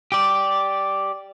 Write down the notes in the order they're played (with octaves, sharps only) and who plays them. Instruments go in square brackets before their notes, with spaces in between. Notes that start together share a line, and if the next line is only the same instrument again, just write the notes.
[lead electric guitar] G4 D5